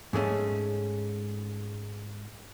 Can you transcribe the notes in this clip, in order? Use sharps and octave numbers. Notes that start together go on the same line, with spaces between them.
G#2 G#3 A3 C#4